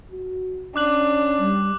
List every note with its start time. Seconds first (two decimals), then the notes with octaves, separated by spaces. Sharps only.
0.11 F#4
0.76 C#4 D4 D6 F#6 F#7
1.39 G3